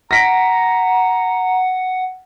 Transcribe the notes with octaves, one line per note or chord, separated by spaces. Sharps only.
F#5 A#5 A#6 B6 D7